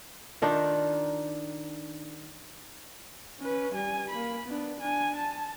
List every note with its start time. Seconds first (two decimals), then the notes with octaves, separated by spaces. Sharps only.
0.42 D#3 D4 D#4 F4
3.39 C#4 B4
3.74 G3 G#5
4.10 A#3 B5
4.45 B3 D4
4.80 D4 G#5
5.16 A5